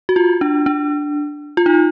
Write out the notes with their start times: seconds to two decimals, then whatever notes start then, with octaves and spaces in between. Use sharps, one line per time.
0.09 F#4
0.16 F4
0.41 D4
0.66 D4
1.57 F4
1.66 D#4